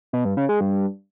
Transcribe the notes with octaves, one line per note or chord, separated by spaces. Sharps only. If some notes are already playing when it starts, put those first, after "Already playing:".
B2
G2
C#3
G#3
G2